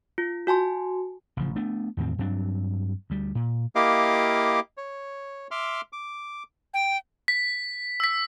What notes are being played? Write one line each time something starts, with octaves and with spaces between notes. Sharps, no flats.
F4
F#4 G#5 A5 C6
A1 C#3 F3
A3 B3 D4
E2 A2 D#3 C4
G2 F#3 C4 D4
D2 G3
A#2
A#3 E4 G4 D#5 F5 D6
C#5
E5 C6 D6 F6
D6
G5
B6
E6 B6